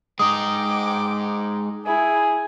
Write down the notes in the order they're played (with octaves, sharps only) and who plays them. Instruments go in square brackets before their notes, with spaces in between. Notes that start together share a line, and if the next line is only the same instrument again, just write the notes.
[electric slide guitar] G#3 D#4 [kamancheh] G5 D6 [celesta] D#6
[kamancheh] E4 [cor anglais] G#4